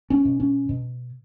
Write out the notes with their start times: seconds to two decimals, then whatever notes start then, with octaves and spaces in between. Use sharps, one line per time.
0.10 C#4
0.25 B2
0.40 C#4
0.69 B2